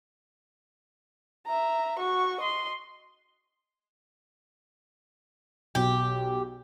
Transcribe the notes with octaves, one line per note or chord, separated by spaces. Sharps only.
E5 A#5
F#4 C#6
D#5 C6
B1 G4